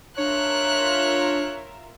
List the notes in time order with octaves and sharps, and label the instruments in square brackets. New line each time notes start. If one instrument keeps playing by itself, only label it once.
[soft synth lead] D4 [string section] F4 A#4 E5 [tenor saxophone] C#5 [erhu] F#6